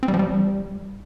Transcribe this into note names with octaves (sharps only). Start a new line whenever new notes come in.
C4
G3
F3
G3